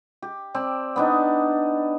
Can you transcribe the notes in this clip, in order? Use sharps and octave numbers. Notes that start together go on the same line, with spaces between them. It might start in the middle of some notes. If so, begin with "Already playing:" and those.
G4
C4 D5 A5
B3 D4 D#4